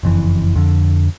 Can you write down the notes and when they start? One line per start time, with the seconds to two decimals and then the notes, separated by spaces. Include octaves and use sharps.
0.03 F#1 F2 E3
0.55 F2 D3